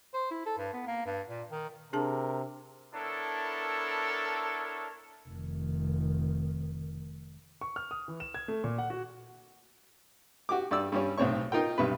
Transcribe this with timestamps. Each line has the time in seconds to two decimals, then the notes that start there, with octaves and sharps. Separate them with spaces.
0.14 C5
0.31 E4
0.45 A4
0.58 G2
0.73 B3
0.87 A#3
1.06 G2
1.28 A#2
1.51 D#3
1.93 C3 D4 G#4 A#4 A5
2.94 B3 D4 E4 A4 A#4 C#5
5.28 F1 D#3
7.61 C#6
7.76 F6
7.91 D#6
8.08 E3
8.20 E7
8.34 G#6
8.48 A3
8.64 A#2
8.78 F#5
8.90 F#4
10.49 F#4 G4 D6
10.71 G2 D5 E6
10.92 G2 G3 C#4
11.18 B1 A2 C4 C#5 C#6
11.52 D#4 F4 A#4 G5
11.78 B1 G2 C3 B4